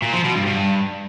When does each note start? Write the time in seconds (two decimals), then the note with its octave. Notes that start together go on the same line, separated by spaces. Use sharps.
0.03 A#2
0.14 F3
0.25 B2
0.36 G2
0.47 G2